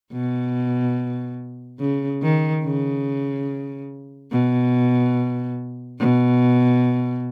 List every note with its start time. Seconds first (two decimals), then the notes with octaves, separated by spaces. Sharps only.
0.12 B2
1.79 C#3
2.22 D#3
2.64 C#3
4.31 B2
5.99 B2